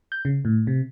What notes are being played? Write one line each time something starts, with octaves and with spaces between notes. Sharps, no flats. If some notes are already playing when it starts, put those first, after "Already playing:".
G6
C#3
A2
C3